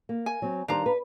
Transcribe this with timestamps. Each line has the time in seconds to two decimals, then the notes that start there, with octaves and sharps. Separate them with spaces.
0.09 A#3
0.26 G#5
0.42 F#3 C4
0.68 D#3 G3 D4 C5 F5 A#5
0.86 B4